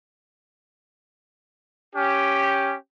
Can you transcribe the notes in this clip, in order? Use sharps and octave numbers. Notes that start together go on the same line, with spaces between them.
C#4 G4